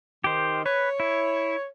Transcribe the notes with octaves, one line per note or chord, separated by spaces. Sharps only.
D#3 G4 C5
B4 C#5
E4